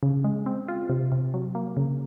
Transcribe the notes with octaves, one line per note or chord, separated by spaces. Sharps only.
C#3
G#3
C4
F4
C3
C3
F#3
A#3
C#3